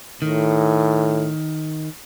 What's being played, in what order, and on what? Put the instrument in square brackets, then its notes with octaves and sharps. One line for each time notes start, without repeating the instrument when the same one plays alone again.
[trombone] A2 [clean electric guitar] D#3